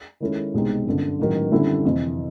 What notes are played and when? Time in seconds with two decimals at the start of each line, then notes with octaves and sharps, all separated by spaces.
0.20 D#3 G#3 C#4 E4 A4
0.54 C2 B2 G#3 C4 D#4
0.87 G1 F#2 D3
1.19 A1 G#2 D#3 F#3
1.52 F#2 D3 G3 C4 E4
1.85 F2 C3 E3